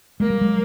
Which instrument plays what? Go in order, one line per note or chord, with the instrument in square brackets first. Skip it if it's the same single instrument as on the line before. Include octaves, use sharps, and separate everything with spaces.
[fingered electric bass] G#3 [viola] A#3
[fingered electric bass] G3
F#3 G#3